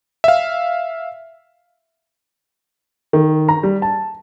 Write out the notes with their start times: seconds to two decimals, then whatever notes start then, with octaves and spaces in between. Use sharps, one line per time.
0.24 E5 F5
3.13 D#3
3.49 A#5
3.63 G3
3.82 A5